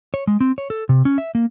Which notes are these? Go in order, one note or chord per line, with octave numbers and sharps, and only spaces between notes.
C#5
G#3
C4
C#5
A4
C3
C#4
E5
A#3